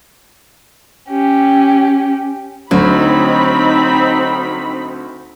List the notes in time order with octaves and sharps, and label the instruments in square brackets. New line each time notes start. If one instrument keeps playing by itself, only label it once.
[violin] C#4 G4
[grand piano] D2 [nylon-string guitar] F#3 [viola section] C4 D#4 B5